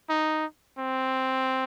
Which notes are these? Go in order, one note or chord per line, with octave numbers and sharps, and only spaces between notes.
D#4
C4